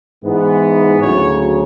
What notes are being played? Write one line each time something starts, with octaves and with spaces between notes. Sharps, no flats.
G#2 E3 B3
D2 C#3 F#3 C#5